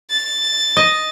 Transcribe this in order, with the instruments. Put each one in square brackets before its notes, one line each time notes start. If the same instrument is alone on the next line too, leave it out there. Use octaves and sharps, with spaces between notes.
[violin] A6
[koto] D#5